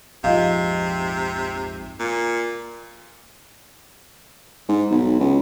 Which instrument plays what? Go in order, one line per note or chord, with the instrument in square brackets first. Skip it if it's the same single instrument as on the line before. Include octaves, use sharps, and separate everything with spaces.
[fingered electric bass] A#1 F2 G#2 [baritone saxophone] C3 [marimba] F4 D#5 F5
[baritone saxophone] A#2
[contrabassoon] G#2
B1
C#2